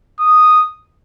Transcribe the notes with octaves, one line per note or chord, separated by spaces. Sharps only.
D#6